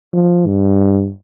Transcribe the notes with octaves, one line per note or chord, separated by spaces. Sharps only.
F3
G2